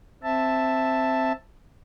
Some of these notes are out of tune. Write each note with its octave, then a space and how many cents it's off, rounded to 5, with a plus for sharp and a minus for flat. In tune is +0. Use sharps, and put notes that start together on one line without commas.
C4 +0 E5 +0 A5 +5